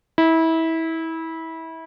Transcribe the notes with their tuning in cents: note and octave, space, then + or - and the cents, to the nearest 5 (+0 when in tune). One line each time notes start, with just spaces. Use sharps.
E4 -25